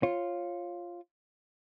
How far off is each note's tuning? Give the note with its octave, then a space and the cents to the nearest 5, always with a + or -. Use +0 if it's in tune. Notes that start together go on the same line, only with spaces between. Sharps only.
F4 +0 C#5 -20